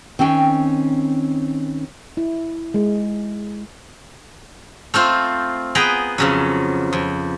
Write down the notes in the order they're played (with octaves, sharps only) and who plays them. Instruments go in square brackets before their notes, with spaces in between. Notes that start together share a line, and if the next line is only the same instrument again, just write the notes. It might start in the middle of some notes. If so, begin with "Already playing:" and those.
[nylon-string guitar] D#3 C4 C#4 F#5 G5
[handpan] E4
G#3
[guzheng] A3 C4 F4 C5
B3 G#4 B4 G5 A#5
F2 C#3 F#3
F2